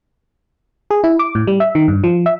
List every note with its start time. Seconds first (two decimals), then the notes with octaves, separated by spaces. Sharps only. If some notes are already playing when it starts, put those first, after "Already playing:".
0.90 G#4
1.04 E4
1.19 D6
1.35 A2
1.47 G3
1.60 E5
1.75 D#3
1.88 G2
2.04 F3
2.26 E5